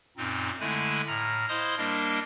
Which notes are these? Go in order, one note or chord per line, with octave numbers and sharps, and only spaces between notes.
F#2 A#2 C4 D#4
D3 G#3 A3 E4 G#5 F#6
A2 A#5 F6 A#6
E4 C5 D#5 F5 C6 D#6
G3 A#3 D4 A#4 D#5